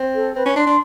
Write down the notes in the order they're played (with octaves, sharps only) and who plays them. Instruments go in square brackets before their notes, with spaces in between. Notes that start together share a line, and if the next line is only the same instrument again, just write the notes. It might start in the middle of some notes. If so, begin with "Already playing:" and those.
Already playing: [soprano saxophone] C4
[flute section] A4
[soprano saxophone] C4 [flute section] B4
[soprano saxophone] C#4
[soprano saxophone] D4 [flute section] C6
[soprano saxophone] D4